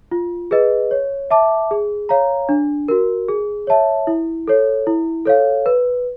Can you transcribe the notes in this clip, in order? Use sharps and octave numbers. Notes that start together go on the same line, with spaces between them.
F4
G#4 B4 D#5
C#5
E5 A5 D6
G#4
C#5 F5 A#5
D4
F#4 A#4
G#4
C#5 E5 A5
E4
A4 C#5
E4
A4 C#5 F5
B4